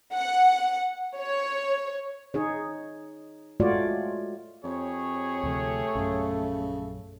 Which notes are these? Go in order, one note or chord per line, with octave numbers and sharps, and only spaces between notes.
F#5
C#5
D#4 G#4 C#5
G#3 A3 F4 F#4 C#5 D5
F2 G4 G#4 C#5
D2 C3 F3 A3
A#1 F#2 C#3